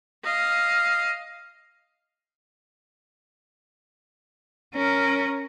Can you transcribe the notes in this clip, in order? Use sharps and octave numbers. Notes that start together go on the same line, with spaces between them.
D#5 F5
C#4 A#4